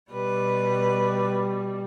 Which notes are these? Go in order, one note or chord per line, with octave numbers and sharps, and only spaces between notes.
B2 G3 B4